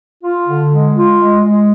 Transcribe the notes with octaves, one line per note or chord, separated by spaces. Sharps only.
F4
D3
G#3
F4
G#3
G#3